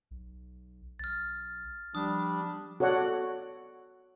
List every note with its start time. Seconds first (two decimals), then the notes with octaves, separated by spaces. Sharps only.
0.11 B1
0.99 B1 F6 A6
1.95 F3 G3 D4 D#6
2.80 F#4 A4 C#5 D5 F#5